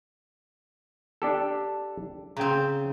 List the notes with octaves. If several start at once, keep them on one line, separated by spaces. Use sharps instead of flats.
D4 G4 A4
C#3 C4 G5 A#5